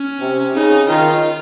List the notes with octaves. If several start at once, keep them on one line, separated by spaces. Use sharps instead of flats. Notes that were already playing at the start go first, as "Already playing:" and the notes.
Already playing: C#4
C3
C#3 D#4
D#3 F4